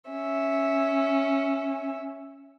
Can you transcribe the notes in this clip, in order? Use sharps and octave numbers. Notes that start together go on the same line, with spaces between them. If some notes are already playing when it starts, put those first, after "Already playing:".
C#4 E5